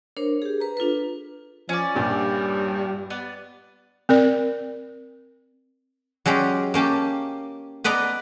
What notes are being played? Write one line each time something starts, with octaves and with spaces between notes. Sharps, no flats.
D4 A#4 C5 C#5
G4 G#4
B4 A#5
D4 F4 A4 B4
F3 C#4 D5
A#1 G2 A#2 G3
B3 D5
C4 A#4 D5
F#3 G#3 C#4 G4 D5
A#3 C#4 G4 A5
B3 B4 D5 D#5 A#5